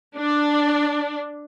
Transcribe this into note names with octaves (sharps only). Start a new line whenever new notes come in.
D4